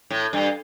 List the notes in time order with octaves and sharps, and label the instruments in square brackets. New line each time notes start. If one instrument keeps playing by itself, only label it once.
[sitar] A2
G2